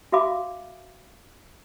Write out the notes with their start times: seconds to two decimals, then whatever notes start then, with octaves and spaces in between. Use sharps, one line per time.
0.12 F#4 E5 F5 B5 D6